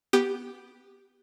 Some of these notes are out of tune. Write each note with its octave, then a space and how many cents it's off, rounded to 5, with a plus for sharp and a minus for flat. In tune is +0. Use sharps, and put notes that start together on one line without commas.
B3 -5 G4 +0 D#6 -40